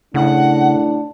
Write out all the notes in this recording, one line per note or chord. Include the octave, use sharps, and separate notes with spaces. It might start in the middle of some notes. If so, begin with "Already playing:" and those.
A2 C#3 D4 F#5